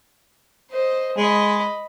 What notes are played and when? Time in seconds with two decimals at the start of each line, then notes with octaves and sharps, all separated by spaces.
0.71 C5 D#5
1.18 G#3 D#5 B5